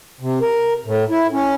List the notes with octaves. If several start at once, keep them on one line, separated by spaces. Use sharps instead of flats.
C3
A#4
A2
E4
C#4